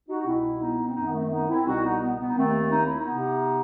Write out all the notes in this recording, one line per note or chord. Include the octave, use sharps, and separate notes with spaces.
D#4 F#4
C2 B2 C4 E4
B3 D#4
C4
F#2 D#3 B3 D#4
B3
A3 C4
B3 D#4
C4 E4
C2 B2 D#4 F#4
B3 D#4
B3
B3
D#4
D#2 D#3 A3 C4
D#4
E4
B3 D#4
C3